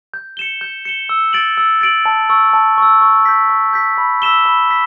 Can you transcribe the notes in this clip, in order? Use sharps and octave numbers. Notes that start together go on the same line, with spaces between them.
G6
C#7 E7 G7
G6
C#7 E7 G7
E6
A6 D7 F#7
E6
A6 D7 F#7
A5
C#6 E6
A5
C#6 E6
C#6
G6 B6
C#6
G6 B6
B5
E6 B6 E7 G7
B5
E6 B6